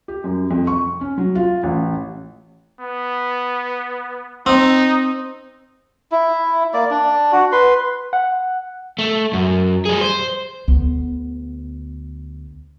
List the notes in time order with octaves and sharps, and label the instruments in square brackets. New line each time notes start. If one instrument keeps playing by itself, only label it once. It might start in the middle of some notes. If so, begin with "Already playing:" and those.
[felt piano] G4
F#2
F2
C#6
C#4
F#3
F4
A1
[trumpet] B3
[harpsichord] C4 [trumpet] D#4
[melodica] E4
A#3 D5
D4
F#4
B4 C6
[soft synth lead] F#5
[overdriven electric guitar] A3
F#2
G3 G#4
C5
[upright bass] D2 B3